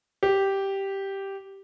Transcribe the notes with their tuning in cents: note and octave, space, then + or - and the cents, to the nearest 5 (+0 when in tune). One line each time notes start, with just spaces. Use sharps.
G4 -5